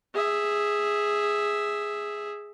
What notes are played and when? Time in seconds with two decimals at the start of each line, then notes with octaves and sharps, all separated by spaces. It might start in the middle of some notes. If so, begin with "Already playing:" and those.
0.14 G#4 E5